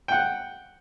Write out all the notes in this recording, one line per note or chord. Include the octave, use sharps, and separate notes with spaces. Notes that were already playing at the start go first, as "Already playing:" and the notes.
F#5 G5